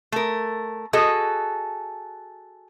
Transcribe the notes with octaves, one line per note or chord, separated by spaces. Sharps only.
A3 A#4
F#4 G#4 A4 D#5